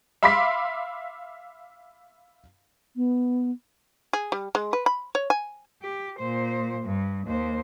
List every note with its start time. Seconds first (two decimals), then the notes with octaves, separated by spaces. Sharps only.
0.23 E5 F5 B5 C6 D6 B6
2.96 B3
4.13 G#4
4.32 G3
4.55 G#3
4.73 B4
4.86 B5
5.15 C#5
5.30 G#5
5.82 G4
6.19 A#2 C5
6.85 G2
7.27 D#2 C5